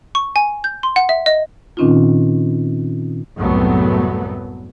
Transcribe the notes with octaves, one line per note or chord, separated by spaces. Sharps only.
C#6
G#5
G6
C6
F#5
E5
D#5
A#2 D#3 C4 C#4 D#4 F4
C2 F#2 A2 F#3 A3 B3